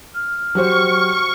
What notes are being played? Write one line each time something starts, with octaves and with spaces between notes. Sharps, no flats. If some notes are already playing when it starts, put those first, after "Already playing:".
F6
F#3 G4 C5 C#6